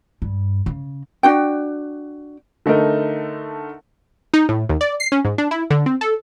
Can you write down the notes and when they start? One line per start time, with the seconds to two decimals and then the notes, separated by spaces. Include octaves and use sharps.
0.22 G2
0.66 C#3
1.23 D4 F#4 G5
2.66 D3 A3 D#4 A#4
4.34 D#4
4.49 A2
4.69 D#2
4.81 D5
5.00 C7
5.12 C#4
5.25 G#2
5.38 D4
5.51 E4
5.70 D3
5.86 C4
6.01 A4